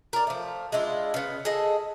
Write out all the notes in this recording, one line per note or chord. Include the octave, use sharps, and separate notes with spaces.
A#4 D5
F3 A3
G#3 D4 E4 F4
C#3 B3
G#4 A4 D#5